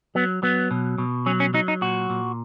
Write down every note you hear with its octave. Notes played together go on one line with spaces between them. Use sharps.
F#3 B3
F#3 B3
B2
B2
F#3 C#4
C#4
F#3 D#4
D#4
A#2 F#4
A#2